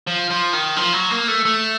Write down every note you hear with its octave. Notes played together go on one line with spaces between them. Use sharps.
F3
F3
D#3
F3
F#3
A#3
A3
A3